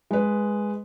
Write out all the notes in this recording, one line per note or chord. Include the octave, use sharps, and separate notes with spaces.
G#3 B4